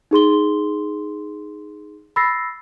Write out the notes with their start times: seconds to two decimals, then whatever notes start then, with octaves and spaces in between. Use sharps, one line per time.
0.11 D#4 G#4 C6 G7
2.16 B5 E6 A6 A#6 C7